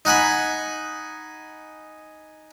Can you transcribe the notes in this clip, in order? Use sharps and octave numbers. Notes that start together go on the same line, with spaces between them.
D#4 F#5 G#5 B5